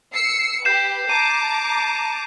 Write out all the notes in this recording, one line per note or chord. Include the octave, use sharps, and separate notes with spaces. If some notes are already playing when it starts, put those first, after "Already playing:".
E6 C7 C#7
G4 B4 G6 C7 E7
A5 A#5 D6 D#7